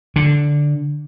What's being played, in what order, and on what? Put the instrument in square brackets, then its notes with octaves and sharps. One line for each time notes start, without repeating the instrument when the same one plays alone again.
[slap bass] D3